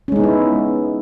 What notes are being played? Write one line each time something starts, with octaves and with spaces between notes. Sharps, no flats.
G#3 B3 C#4 D#4 E4